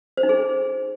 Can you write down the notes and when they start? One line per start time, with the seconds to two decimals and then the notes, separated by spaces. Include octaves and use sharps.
0.17 C5
0.23 D#4
0.29 G#4